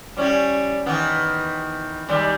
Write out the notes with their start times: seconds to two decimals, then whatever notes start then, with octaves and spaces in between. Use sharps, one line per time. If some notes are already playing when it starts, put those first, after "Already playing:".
0.17 G3 C#4 E4
0.86 D#3 E3 B3
2.09 D#3 G3 G#3